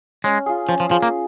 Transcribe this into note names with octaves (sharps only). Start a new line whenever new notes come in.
G#3 C#4
F4 G#4
F3 C#4
F3
F3 F4 G#4
A#3